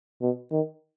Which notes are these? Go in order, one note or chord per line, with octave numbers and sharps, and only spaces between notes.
B2
D#3